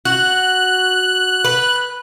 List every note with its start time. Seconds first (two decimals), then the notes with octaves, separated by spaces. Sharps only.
0.05 F#4 F#6
1.45 B4